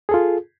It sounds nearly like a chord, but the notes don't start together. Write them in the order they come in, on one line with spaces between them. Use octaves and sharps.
G#4 A4 F4